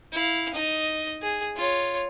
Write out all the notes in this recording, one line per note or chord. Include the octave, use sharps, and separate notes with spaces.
E4 F5
D#4 D#5
G#4
F4 C#5